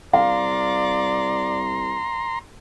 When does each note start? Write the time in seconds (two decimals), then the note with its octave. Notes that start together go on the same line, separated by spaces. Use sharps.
0.13 C2 D5 F5 A#5 C6